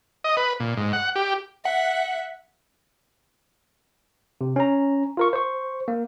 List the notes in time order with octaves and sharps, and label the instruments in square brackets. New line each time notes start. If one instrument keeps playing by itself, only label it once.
[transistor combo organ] D#5
B4
A#2
G#2
F#5
G4
[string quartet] E5 [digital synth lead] F#5
[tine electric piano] C3
C#4 A#5
F4 A#4 C#6
C5 C#6
A#3